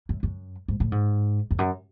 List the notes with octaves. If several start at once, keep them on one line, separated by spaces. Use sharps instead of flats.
F#2
F#2
G#2
A2
G#2
F2
F#2